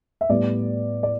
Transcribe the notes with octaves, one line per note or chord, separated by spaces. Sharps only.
E5
A2 G3 B3 D5
D5